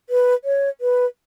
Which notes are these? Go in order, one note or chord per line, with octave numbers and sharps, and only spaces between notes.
B4
C#5
B4